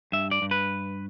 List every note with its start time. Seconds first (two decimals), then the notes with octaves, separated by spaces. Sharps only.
0.12 G2 E5
0.31 D5
0.42 G2
0.51 B4